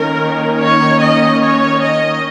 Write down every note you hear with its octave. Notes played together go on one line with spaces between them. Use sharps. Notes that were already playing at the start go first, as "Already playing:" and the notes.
Already playing: D#3 A#3 C#4 A#4
C#5
D#5
C#5
D#5